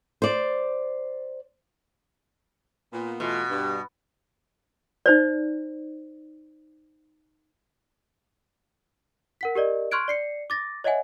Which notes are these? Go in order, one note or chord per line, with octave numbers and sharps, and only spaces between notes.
C5 D5
A#2 B3
B2 E3 A3 F4
G2
D#4 C5 D5
A#4 F#5 B6
G4 A#4 D5 D#5
C6 C#6 F6 F#6 G#6 D7
D5 C7 C#7
D6 A6 A#6
C#5 D#5 E5 F#5 G#5